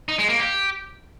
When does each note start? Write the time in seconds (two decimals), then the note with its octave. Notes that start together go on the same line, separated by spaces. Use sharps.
0.09 D#4
0.19 G#3
0.29 A#3
0.39 G4